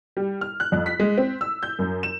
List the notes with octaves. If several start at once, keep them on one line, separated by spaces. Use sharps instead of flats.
G3
F6
F#6
F2
B6
G#3
C4
E6
G6
F#2
E7